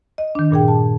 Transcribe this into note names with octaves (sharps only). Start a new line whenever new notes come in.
D#5
D#3 D4
G2 A#2 G#4 G5
A5